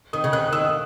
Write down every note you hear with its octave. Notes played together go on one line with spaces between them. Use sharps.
D#3 D#6
C#3
D#3 F#6
D#6
D#3 E6
D#6